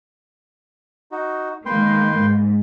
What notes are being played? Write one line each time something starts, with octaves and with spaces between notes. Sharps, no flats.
D#4 F#4
D#3 G#3 A#3 B4 G5 C6
G#2